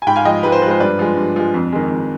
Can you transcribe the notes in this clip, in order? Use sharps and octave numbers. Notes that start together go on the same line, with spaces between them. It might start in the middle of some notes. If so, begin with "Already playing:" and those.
G#5
G#2 G5 B5
F5 G#5
F3 G#3 D#5 G5
G#2 B4
C5
F3 G#3 B4 C5
G2 B4 D5
F3 G#3
G2
F3 G#3
F2
D#3 G#3
F2